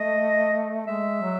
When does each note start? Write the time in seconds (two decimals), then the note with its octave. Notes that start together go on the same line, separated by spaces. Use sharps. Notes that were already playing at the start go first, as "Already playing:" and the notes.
Already playing: A3 D#5
0.87 G#3 E5
1.21 F#3